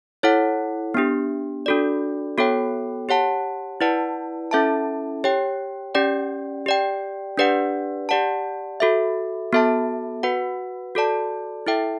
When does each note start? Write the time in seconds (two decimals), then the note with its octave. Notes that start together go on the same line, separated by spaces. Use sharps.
0.23 E4 A4 C#5 F#5
0.94 B3 D4 G4
1.66 D4 F#4 A4 D5
2.38 B3 F#4 A4 C#5 G5
3.09 G4 C#5 F#5 A5
3.81 E4 B4 D5 F#5 A5
4.51 C#4 E4 A4 E5 A5
5.24 G4 C#5 G5
5.95 C#4 G4 D5 G5
6.66 G4 D5 G5
7.37 D4 G4 B4 D5 F#5
8.09 G4 D5 F#5 A5
8.80 F#4 A4 E5
9.53 B3 F#4 A4 E5 A5
10.23 F#4 B4 F#5
10.95 F#4 A4 D5 A5
11.67 E4 A4 E5 G5